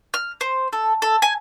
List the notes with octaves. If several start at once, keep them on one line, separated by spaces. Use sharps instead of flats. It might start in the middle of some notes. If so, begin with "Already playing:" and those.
F6
C5
A4
A4
G#5